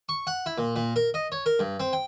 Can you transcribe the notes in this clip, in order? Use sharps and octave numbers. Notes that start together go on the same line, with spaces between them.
C#6
F#5
E4
A#2
A#2
A#4
D#5
C#5
A#4
G2
C4
G5